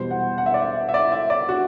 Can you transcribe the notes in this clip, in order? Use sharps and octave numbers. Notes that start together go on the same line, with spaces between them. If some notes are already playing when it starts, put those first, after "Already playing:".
Already playing: E2 B2 G3 C5
F#5
F#5
E5
D5
E5
E5
D5
E5
D5
F#4